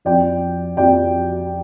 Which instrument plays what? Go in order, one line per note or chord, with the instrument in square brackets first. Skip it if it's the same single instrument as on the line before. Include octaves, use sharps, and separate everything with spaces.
[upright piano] F2 F3 D5 G5
F2 F3 D5 G5